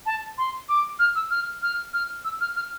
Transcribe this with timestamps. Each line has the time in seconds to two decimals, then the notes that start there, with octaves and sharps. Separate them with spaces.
0.05 A5
0.37 C6
0.68 D6
0.98 F6
1.15 E6
1.30 F6
1.62 F6
1.93 F6
2.24 E6
2.40 F6
2.55 F6